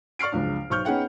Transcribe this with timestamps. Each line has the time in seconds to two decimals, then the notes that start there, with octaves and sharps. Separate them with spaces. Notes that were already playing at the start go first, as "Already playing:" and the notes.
0.19 D5 C#6 F6 C7 D7
0.32 F#1 C#2 F3 D4
0.70 B1 C5 C#6 F6 G6
0.85 B3 C#4 D#4 G#4 F#5 G5